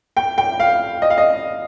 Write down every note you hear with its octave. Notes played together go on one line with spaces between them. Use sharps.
G5
G5
F5
D#5
F5
D#5